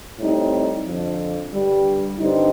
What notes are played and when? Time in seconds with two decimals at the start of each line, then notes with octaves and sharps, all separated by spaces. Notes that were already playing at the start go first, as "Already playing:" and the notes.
0.20 A2 G3 C4 D#4
0.86 F2 D3 F3
1.53 G2 D3 G3
2.20 G2 D3 G3 C4 D#4